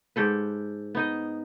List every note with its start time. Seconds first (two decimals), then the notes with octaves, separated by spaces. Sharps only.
0.16 G#2 G4 A4 B4
0.95 B3 D#4 D#5